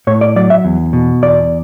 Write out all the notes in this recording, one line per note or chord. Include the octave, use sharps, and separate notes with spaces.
A2 C#5
D5
F#3 D5
E5
E2
B2
E2 D5